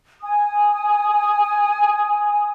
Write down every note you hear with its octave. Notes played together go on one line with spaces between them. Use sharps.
G#5 D#6